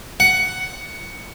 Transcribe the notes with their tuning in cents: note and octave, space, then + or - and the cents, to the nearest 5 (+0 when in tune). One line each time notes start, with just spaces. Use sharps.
F#5 +10